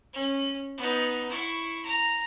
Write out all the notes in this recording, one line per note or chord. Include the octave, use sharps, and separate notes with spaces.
C#4
B3 D#4
E4 C#6
A#5